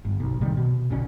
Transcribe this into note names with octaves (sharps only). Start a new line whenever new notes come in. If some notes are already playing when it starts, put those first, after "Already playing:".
G1
B1
C3 D#3 G3
B2
B1 B2 D3 C#4